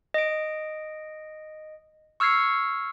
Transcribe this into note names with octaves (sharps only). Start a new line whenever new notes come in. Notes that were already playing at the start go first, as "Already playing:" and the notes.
D#5 D7
C#6 E6 F6 G#6 C7 C#7